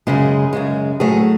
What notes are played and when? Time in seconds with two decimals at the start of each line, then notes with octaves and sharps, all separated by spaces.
0.07 F#2 C#3 G#3 G#4
0.53 F#2 C#3 G#3
1.00 A2 F#3 A3 G#4